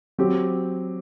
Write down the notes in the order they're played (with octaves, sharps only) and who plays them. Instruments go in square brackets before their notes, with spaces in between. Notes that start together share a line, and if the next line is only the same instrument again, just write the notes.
[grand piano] F#3 C4 G4